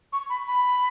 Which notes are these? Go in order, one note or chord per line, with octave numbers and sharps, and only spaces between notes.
C#6
B5
B5